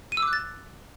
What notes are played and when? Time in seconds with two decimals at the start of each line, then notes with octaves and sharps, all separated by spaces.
0.12 D#7
0.17 E6
0.22 D6
0.28 F#6
0.33 A6